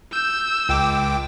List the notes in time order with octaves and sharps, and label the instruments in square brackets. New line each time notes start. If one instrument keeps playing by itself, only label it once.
[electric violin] E6 [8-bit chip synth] G6
[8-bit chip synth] C#2 G5 D6